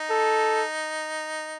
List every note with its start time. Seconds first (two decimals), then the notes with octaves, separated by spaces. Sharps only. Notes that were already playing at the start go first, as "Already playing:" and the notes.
Already playing: D#4
0.10 A4